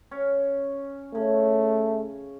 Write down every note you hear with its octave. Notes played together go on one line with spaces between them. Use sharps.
C#4
C#3 A3